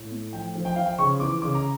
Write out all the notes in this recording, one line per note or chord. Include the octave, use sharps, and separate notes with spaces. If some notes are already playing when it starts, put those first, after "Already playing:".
Already playing: A2
A3
F3 G5
F3
G5
F3 F5
G5
C#3 C#6
E3 D6
C#3 D6
A#5